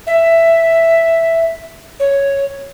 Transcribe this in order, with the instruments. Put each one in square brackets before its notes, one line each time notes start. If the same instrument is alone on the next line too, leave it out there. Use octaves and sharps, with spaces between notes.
[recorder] E5
C#5